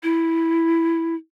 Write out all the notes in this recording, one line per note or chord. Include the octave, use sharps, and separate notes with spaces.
E4